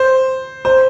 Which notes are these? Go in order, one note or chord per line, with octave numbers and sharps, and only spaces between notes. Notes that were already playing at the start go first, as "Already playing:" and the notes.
Already playing: C5
C5